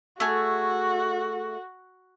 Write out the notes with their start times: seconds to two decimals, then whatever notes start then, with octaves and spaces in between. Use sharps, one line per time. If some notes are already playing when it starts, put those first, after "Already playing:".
0.20 A3 F#4 G#4